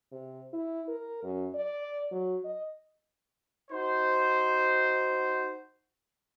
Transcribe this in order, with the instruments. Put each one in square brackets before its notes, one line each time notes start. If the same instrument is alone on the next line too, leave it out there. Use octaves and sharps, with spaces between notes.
[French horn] C3
E4
A#4
F#2
D5
F#3
D#5
[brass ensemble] D#4 F#4 C5